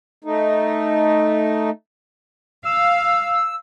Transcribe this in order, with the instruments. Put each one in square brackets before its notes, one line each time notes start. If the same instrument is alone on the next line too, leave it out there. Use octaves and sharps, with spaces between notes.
[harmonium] A3 D#4
[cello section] F5 [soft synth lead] E6